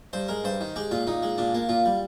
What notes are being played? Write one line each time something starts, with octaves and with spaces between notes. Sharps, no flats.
G2 C5
G#3 A#4
G2 C5
D#3
G#3 G4
A#2 F4
A#2 D#4
G#3
A#2 D4
A#3
A#2 F4
G3